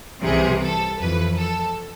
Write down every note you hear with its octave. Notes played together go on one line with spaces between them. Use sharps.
C2 C3 E3 G#4
A4
F2 E3 B4
A4